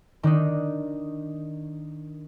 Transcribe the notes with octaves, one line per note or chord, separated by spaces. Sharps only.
D#3 D4 D#4